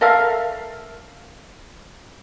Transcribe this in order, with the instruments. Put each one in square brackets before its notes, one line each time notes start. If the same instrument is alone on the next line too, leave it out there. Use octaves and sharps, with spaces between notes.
[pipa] A4 A#4 E5 F5